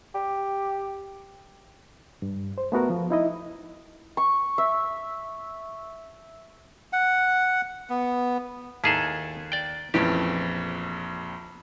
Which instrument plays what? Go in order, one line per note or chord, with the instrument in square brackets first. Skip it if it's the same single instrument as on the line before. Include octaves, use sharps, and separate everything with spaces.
[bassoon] G4
[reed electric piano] G2
C5
A3 B3 F#4 A#4
F3
D#4 E4 D#5
[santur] C#6
E5
[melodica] F#5
B3
[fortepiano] D#2 A5 [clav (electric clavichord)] E4 G#4 A4
[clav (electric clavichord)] D5 G5
[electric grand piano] A#1 F2 [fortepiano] E3 A3 C#4 [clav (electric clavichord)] G4